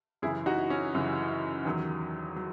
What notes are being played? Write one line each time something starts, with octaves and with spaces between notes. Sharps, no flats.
F#2 C#3 E3 E4 G#4
D#4 F#4
C#4
F#2 C#3 E3
E2 D#3 F#3
F#3